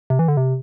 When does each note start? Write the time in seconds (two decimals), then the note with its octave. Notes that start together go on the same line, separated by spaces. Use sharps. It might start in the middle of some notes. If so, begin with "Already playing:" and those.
0.10 C3
0.19 E3
0.28 D3
0.37 C3